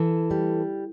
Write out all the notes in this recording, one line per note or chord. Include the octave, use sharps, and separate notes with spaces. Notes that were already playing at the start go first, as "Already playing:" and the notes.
Already playing: E3 A4
G3